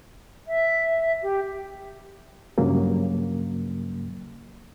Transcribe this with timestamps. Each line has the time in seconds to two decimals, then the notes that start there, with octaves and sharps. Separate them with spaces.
0.48 E5
1.22 G4
2.58 G2 C#3 F#3 A#3